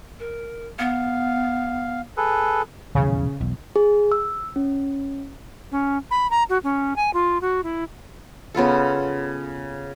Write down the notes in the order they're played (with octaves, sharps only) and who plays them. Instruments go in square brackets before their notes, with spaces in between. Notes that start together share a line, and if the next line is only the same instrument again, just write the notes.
[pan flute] A#4
[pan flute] B3 [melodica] F5
[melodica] G#4 A4 B4
[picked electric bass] D#1 B1 E2 [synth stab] C#3
[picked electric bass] B1 E2
[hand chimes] G#4
E6
C#4
[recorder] C#4
B5
A#5
F#4
C#4
G#5
F4
F#4
E4
[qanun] C#3 B3 F4 A4